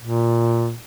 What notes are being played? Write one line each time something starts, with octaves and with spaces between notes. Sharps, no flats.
A#2